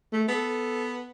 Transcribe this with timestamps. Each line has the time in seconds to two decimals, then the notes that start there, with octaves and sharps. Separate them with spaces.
0.13 A3
0.28 B3 A4